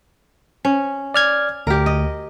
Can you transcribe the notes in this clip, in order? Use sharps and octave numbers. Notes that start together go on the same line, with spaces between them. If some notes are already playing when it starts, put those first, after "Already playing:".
C#4
D5 F6 G#6
D2 G4 A#4
D#5